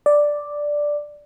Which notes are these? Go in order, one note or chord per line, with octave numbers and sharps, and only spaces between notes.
D5